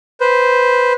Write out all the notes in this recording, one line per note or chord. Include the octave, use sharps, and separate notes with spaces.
B4 C5